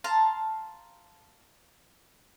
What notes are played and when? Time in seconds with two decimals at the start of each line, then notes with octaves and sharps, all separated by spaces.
0.04 F5 A5 A#5 C6